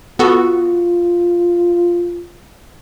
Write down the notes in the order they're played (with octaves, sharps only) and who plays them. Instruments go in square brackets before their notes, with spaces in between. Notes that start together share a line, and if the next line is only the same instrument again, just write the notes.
[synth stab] B3 F#4 A4 [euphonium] F4